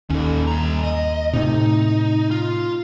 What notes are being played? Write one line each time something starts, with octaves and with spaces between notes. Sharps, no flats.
D#2 C#4 A4
G2 A#5
D#5
A2 C3 D#4
F4